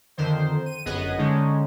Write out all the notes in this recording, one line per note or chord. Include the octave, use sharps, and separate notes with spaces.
F2 D3 D#3 C5
D#7
G1 F#2 B3 G#4 D#5
D3 G#3 C#4 D#4